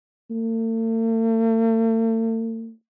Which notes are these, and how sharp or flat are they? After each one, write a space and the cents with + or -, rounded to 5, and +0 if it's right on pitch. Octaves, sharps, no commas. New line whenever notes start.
A3 +45